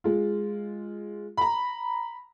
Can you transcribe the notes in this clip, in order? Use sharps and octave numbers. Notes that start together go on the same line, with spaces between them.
G#3 F4
A#5 B5